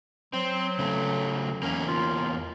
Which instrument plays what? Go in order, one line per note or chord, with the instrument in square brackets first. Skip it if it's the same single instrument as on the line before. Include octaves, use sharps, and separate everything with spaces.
[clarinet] F#3 [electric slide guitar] C4
[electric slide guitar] C#3 A3
[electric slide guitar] E2 A#3 A#4 [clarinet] C#4
[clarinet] F4